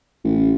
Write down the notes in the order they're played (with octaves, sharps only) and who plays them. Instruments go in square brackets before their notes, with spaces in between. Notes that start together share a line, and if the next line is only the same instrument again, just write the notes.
[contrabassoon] A1